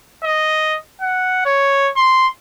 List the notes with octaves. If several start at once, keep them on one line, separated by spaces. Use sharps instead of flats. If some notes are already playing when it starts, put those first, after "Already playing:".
D#5
F#5
C#5
C6